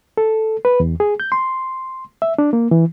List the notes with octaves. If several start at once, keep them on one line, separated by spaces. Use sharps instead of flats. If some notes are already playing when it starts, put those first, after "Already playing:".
A4
B4
E2
G#4
G6
C6
E5
D4
A#3
E3